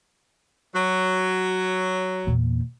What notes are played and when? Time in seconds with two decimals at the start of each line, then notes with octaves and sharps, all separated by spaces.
0.75 F#3
2.27 E2 A#2